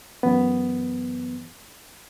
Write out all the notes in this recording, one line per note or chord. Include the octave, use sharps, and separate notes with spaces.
F#2 E3 B3